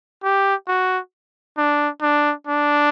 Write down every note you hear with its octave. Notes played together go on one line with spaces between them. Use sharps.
G4
F#4
D4
D4
D4